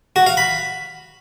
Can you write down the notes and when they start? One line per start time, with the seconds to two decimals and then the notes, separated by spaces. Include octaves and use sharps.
0.16 F#4
0.27 F5
0.37 B5